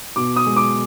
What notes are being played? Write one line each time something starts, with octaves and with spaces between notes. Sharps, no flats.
B2 D6
D#6
G#3
D6